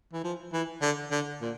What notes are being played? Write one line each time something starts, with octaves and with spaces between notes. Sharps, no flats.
E3
F3
E3
D3
D3
A#2